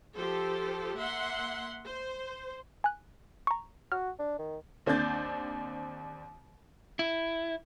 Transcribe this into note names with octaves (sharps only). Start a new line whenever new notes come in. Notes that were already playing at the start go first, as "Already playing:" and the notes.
F3 G4 A4 C5
A#3 E5 F#5 C6
C5
G#5 F#6
A#5 C#6
F#4 F6
D4
D#3
D#2 C4 D4 G6 A6
E4